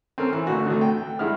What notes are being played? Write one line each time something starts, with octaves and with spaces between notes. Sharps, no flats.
C4 C#4 A4 A#4
E3
A#1 D3 A3 F#4
D2 A3
G5
G2 G#3 E4 F#5 F6